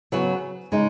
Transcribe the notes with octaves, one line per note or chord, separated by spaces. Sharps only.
C#3 F#3 B3 F#4
C#3 G#3 D#4